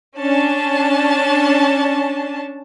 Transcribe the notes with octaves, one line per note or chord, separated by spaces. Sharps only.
C#4 D4 A5